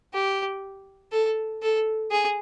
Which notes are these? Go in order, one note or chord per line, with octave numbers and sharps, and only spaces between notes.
G4
A4
A4
G#4